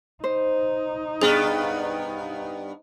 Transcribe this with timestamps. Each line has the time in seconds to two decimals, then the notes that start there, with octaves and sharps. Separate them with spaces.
0.24 D#4 C5
1.21 G2 B3 G#4